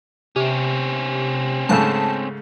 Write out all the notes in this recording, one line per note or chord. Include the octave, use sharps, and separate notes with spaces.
C3 C4 C#4
G#2 C#3 A3 A5